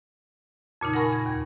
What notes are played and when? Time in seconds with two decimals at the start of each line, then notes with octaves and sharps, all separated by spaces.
0.81 F2 A#2 C#3 D#4
0.94 A#4 F#5 G#5 B5 C#6 A#6
1.12 G#6
1.26 D#2